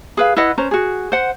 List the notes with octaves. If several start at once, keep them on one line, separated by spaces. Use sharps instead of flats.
G#4 B4 F5
E4 B4 D#5 F#5
C#4 B4 C5 A#5
F#4 G#4
C5 F#5